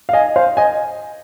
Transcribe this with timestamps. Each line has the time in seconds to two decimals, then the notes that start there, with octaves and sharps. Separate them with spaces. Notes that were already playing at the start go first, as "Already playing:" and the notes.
0.09 F5
0.13 D#5 G#5
0.36 C5 F5
0.57 D#5 G#5